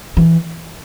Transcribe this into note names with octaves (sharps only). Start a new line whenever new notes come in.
E3